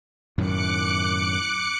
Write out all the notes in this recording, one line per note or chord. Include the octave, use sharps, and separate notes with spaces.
F#2 A2 D#3 D6 F#6 C#7